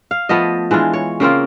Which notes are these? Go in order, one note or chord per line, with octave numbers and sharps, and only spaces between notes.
F5
F3 A3 B3 D#5
E3 G#3 D4 F4
C#5
C#3 A#3 C4 F4